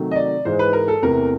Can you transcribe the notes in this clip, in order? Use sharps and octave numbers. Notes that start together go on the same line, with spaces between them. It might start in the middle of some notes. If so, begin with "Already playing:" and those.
Already playing: C3 D#3 F#3 A3
D#5
D5
G#2 E3 G#3 C5
B4
A#4
A4
E2 C3 E3 A3 A#4